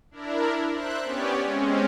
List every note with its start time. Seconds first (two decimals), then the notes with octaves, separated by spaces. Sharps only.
0.11 D4 E4 A#4
0.73 C5 E5 F#6
1.03 B3 C#4 G4 C#5 D5
1.44 G#3 C4 C#4